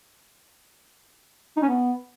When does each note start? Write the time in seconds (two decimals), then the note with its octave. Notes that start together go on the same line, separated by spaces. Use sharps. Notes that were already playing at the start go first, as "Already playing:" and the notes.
1.57 D#4
1.63 C#4
1.68 B3